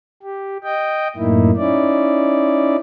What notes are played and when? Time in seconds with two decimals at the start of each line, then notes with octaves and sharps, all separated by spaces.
0.23 G4
0.64 D#5 G5
1.16 F#2 A2 A#3 D#4 E4
1.57 C#4 D#4 E4 D5